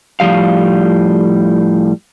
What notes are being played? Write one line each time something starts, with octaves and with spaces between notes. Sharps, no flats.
A2 F3 G3 F5